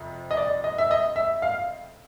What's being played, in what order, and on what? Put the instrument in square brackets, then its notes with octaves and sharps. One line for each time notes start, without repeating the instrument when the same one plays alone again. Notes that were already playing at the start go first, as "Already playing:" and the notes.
Already playing: [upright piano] F2 C3
D#5
D5
D#5
E5
D#5
E5
F5